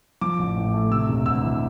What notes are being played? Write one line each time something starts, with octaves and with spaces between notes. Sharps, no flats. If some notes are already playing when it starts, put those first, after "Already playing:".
F3 D6
A1
A2
A3
C3 E6
E1
D2 E6
E3